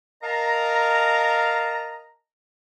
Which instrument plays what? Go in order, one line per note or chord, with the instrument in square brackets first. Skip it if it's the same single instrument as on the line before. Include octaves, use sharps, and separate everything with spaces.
[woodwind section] A#4 D#5 F5 A5 A#5